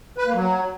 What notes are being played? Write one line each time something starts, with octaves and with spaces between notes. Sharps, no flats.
B4
A#3
F#3